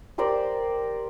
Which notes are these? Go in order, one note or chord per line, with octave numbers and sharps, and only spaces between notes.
G4 A#4 C5 D5